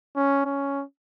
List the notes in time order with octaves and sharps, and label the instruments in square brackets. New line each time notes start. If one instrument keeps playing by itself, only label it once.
[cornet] C#4
C#4